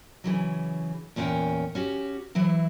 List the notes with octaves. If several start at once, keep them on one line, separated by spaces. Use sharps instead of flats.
C#3 E3 F#3
E2 A#2 C#4 A#4 G5
C#4 F#4 G4
E3 F#3 E4